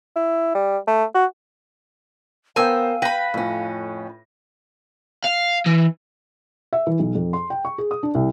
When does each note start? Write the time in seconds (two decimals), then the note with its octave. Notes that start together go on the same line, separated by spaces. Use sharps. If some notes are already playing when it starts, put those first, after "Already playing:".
0.16 E4
0.55 G3
0.88 A3
1.15 F#4
2.56 B3 A#4 C5 F5 G5 G#5 E6
3.02 B4 G5 B5 A#6 D#7
3.34 F2 A2 C#4
5.25 F5
5.66 E3
6.73 E5
6.87 E3
6.99 B1
7.15 F2
7.33 C6
7.50 G5
7.65 C#6
7.78 G#4
7.91 D#6
8.03 D4
8.15 C2